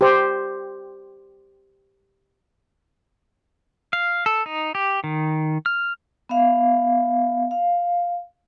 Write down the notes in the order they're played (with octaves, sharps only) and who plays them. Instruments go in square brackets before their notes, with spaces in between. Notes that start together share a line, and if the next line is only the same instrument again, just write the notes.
[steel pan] G4 C5
[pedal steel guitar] F5
A4
D#4
G4
D#3
F6
[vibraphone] B3 E5 F5
F5